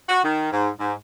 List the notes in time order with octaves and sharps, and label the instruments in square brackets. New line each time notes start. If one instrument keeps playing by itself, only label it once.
[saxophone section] F#4
D#3
G#2
G#2